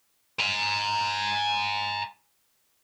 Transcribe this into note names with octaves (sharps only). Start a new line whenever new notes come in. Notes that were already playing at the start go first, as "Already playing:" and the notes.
G#5 A#5